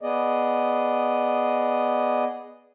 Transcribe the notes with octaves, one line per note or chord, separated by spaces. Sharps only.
B3 G#4 D5 D#5